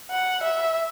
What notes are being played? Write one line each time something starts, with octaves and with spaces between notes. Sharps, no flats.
F#5
E5